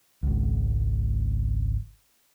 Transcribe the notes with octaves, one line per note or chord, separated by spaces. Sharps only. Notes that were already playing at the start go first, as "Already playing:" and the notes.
G#1 C#2